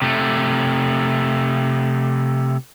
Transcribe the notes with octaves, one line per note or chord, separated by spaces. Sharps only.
C3 A3